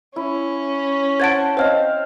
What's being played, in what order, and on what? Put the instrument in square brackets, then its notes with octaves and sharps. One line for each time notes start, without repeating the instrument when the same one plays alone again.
[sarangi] C#4 [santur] E4
[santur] C5 F#5 A5 [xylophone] G#6 A6 D7
[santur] C4 F5 [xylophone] C5 C#5 D#5